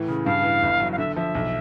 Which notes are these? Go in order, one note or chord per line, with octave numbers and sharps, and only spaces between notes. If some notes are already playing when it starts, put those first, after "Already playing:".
Already playing: A2 E3
C#3
G2 F5
E3
G1
F#3
F5
D3 E5
F3 E5
B1